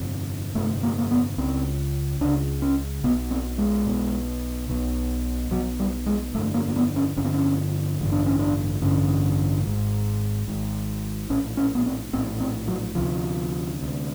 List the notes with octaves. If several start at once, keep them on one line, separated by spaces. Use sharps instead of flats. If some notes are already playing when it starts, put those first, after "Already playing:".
Already playing: G1 F2 C3
G1 F2 C3 A3
A#3
A#3
B3
C#2 C#3 C4
C#2 C#3 D4
C#4
B1 B2 B3
C4
G#3
B1 B2
B1 B2
B1 B2 F#3
G3
G#3
G1 F2 D3 A3
A#3
A#3
B3
C#4
G1 F2 D3 C#4
C4
C#4
A1 G2 D3
D4
C#4
D4
A1 G2 D3 C#4
G#1 G#2
G#1 G#2
A#1 A2 C#4
C#4
B3
C4
A#1 A2 C4
C4
F#3
D2 C3 F3
D2 C3